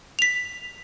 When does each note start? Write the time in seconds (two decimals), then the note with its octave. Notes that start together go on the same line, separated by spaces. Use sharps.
0.19 B6 F7